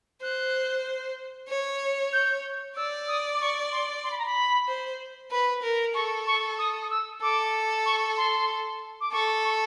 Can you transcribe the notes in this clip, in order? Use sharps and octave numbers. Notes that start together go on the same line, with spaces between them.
C5 F#6
C#5
G6
D5 E6
D#6
D6
C#6
C6
C6
B5
A#5
B5
C5
B4 B5
A#4
A4 C#6
C#6
D#6
D#6
E6
A4 D6
C#6
C6
D6
A4 C#6
C#6